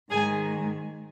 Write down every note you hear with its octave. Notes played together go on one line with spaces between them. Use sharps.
G#2 D#3 G#3 G#4 G#5